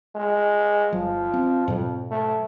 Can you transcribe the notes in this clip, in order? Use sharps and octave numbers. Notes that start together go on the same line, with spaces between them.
G#3
G1 F3 F#3
C4
F2 G#2 B2 F#3
A3